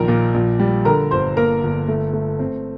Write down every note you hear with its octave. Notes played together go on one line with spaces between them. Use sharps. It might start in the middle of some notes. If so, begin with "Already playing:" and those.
Already playing: A#1 D#3 A#4 A#5
A#2
A#1
G3
D3 A#4 A#5
G1 C5 C6
A#3 A#4 A#5
G1
A3
A3
C4